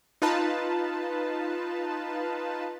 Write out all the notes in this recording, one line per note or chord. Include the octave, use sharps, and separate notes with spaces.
D#4 F4 B4 A5